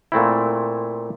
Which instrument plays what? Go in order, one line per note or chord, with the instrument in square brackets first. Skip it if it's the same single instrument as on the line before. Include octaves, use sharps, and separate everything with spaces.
[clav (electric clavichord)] A#2 A3 C4 E4